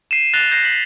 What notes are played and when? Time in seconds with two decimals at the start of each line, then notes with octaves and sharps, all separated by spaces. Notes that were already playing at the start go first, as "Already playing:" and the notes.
0.11 C7 D#7 E7
0.33 F#6 A6 A#6 C7 F7 G7
0.51 F#6 G6 A#6 C7
0.63 B6 F#7